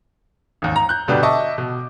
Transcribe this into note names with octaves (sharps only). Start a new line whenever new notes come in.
G#1 D#2
A#5
F#6 G6
G1 B2 D3 D4 G4 B4
D#5 E5 A5 C#6 D6
B2